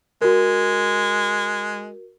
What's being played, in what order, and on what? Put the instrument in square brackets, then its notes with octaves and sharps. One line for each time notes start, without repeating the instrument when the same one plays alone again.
[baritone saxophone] G#3 [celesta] F#4 A#4